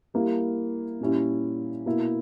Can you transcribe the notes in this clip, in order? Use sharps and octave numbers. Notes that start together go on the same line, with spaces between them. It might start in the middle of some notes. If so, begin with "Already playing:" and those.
G3 A#3 E4
A#2 G3 C#4 E4
B2 A#3 E4